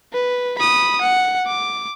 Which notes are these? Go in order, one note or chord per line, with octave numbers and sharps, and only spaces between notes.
B4
B5 D#6
F#5
D6